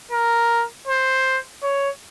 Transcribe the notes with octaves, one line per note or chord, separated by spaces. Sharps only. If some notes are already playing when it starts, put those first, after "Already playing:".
A#4
C5
C#5